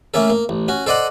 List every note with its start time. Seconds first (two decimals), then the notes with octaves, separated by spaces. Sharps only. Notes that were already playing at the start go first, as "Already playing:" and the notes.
0.14 A3 A#3 C#4 A4
0.30 A#3
0.49 A1
0.68 C#4 F#4
0.86 A4 C5 D5 D#5 F#5